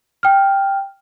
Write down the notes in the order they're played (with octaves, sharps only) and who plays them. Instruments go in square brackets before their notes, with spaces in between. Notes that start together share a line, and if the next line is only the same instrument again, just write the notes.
[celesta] G5 F6